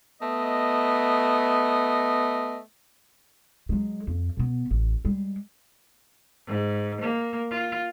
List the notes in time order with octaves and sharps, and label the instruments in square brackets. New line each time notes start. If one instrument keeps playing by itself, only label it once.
[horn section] A3 B3 D#5
[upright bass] F#3 G#3
F2
B2 B3
A1
G3 G#3
[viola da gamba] G#2
A#3
F4